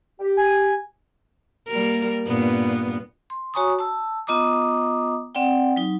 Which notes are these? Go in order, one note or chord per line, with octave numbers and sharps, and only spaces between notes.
G4
G#5
G3 A#3 A#4
G2 A#2 B3
C6
F#4 C#5 G#5 A#5 C#6 D#6
A5 E6
B3 F4 D#5 A#5 D6 D#6
C4 D5 F#5 G5
F#3 D#4